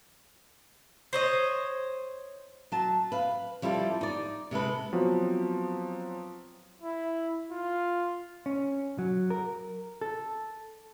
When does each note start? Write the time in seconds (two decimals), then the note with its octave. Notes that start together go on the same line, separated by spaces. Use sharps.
1.13 C5 C#5 D#5
2.72 F#3 A5
3.12 B4 F5
3.62 F3 G3 E4 G4 A4
4.01 D#4 D5
4.51 C3 G#3 A4 B4
4.93 F3 F#3 B3 C4 F#4
6.82 E4
7.51 F4
8.46 C#4
8.99 F#3
9.30 A#4
10.01 A4